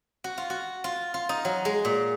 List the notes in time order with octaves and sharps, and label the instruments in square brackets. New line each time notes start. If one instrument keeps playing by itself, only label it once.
[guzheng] F#4
F4
F#4
F4
F4
D#4
F#3
G#3
A#2